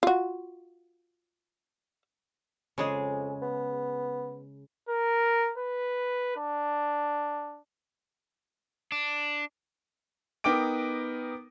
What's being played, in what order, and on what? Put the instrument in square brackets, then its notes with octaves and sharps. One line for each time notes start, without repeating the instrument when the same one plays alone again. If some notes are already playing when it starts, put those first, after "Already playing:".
[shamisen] F4 F#4
[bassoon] F2 [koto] C#3 G#3 G#4
[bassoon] B3
[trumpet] A#4
B4
D4
[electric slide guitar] D4
[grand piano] B3 D#4 A#4 G5 D6 D7